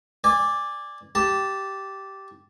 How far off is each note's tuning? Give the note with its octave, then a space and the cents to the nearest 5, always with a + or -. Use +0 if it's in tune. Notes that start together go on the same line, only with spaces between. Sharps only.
D5 +0 G#5 -25
G4 -10 A5 +0